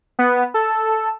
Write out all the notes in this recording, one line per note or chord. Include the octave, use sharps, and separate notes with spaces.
B3
A4